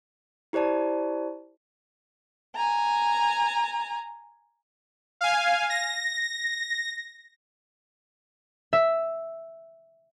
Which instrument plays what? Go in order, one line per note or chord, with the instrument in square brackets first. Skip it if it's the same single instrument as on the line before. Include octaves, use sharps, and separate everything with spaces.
[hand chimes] E4 G4 C5 D5 A5
[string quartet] G#5 A#5
[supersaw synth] F5 G#5
A#6
[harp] E5